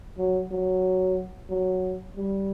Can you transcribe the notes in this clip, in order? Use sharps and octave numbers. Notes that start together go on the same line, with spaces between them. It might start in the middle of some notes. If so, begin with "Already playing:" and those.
F#3
F#3
F#3
G3